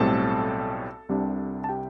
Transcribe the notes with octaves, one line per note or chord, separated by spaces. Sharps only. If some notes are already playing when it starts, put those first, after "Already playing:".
Already playing: B1 A2 G3 C4 A4 A5
C2 C3 G3 D4
A5
G4 G5